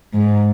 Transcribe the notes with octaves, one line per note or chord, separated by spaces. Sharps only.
G#2